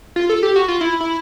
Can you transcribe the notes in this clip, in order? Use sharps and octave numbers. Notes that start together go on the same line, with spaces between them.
F4
A4
G4
F#4
F4
E4
E4